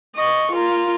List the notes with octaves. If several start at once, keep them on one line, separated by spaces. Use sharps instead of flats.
D#5 C#6
F4 A#4